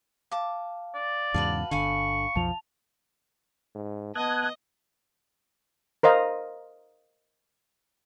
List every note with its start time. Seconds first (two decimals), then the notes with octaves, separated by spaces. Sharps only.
0.31 F5 A5 D6
0.94 D5
1.34 E2 G#2 C#3 F#4 B4 F5 A5 F#7
1.71 G1 D3 F5 G#5 B5 C#6
2.36 B1 F2 F3 A5 F7
3.75 G#2
4.15 B3 D#5 A5 D#6 F#6 G#6
6.03 A#4 C5 D#5 F5